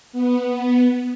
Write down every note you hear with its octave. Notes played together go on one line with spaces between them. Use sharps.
B3